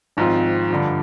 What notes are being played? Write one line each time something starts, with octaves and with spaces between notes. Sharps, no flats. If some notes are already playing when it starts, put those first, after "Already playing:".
G#1 G#2 F3 C4 F4
G2 D3 F3